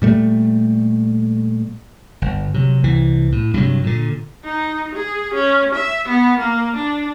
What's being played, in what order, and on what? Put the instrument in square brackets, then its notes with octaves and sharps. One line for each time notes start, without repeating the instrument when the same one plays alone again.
[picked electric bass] A#2 G3 A3
[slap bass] G1
C3 F#3
C2 E3
A2
G2 C3 F#3
A#2 D3
[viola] D#4
G#4
C#4
E5
B3
A#3
D4